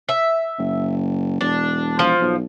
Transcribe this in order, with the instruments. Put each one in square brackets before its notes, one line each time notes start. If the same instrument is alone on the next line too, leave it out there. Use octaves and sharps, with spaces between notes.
[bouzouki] E5
[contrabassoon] F#1
[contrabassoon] E1 [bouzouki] D4
[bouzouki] F3
[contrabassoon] B1